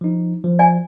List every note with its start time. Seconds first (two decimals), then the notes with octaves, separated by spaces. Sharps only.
0.01 F3 D#4
0.44 F3
0.59 D5 G#5